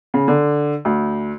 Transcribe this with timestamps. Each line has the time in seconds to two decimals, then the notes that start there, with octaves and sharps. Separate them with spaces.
0.14 C#3
0.28 D3
0.85 D2